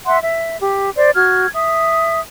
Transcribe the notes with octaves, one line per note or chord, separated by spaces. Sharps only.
E5 F#5 C6
E5
G4
C5 D5
F#4 F6 G#6
E5 D#6